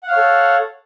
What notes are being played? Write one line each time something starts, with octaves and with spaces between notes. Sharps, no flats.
A4 C#5 F5 F#5